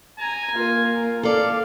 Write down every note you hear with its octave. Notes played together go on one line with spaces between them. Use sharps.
G#5 A#5
A#3 F4 A#4
A#4
A4 D5 F5